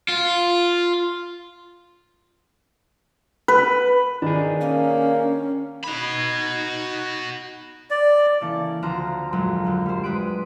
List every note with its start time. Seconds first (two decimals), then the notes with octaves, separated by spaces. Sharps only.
0.08 F4
3.48 B4
4.22 D#3 D4 G#4
4.61 A#3 C#4
5.84 D#4 F#4 B5 G#6
7.91 D5
8.41 C#3 E3 A#3 A4
8.82 D2 F3 D4 C5 A#5 F6
9.33 A#1 F2 F#3 G#3
9.65 F#2 D3
9.86 G3 C5
10.03 G#3 D4 B4 D#6 F#6 D7